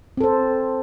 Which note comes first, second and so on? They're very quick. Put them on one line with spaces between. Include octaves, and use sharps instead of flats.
C4 A4 C5